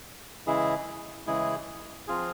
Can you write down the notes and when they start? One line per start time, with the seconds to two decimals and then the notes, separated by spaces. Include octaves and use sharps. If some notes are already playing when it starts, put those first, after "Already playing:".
0.47 C#3 E3 G#3 E4 G#4
1.27 C#3 E3 G#3 E4 G#4
2.07 F3 C4 F4 G#4